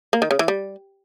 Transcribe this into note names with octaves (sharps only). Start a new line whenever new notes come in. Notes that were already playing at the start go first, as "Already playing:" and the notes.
A#3
D#3
C#3
E3
G3